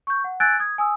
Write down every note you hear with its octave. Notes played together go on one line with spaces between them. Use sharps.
C#6 G6
F#5
G#5 E6 F#6 G#6 A6 D7
D#6 G#6
G#5 D#6 E6